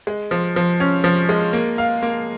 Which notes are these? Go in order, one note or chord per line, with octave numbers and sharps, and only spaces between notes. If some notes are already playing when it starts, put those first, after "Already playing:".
G#3
F3
F3
C#4
F3
G#3
A#3
F5
A#3